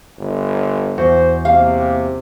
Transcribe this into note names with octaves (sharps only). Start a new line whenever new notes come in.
G1
E2 F#4 C5
C3 A#3 F5